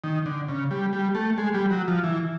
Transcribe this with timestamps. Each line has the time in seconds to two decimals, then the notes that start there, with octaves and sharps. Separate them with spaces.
0.04 D#3
0.26 D3
0.49 C#3
0.71 G3
0.93 G3
1.15 A3
1.38 G#3
1.54 G3
1.71 F#3
1.88 F3
2.04 E3